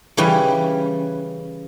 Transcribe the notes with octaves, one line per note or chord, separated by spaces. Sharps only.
C#3 E3 G3 C#4